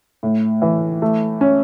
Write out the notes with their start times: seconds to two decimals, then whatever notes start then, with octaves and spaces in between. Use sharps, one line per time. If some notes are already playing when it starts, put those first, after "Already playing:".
0.23 A2
0.62 E3
1.02 A3
1.41 C#4